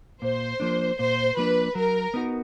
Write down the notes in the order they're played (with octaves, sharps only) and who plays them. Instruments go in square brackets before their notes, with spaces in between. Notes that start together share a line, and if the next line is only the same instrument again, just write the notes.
[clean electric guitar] A#2 [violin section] C5
[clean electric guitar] F3 A#3 D4
[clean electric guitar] A#2 [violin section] C5
[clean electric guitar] F3 A#3 D4 [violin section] B4
[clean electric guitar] F#3 [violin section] A#4
[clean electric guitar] B3 D#4 F#4